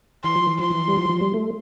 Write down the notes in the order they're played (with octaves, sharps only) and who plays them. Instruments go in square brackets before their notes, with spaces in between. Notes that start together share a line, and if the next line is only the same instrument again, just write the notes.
[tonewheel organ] E3 [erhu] C6
[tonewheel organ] F3
E3
[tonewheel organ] F3 [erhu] C6
[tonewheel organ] E3
G3
F3
F3
G3
A3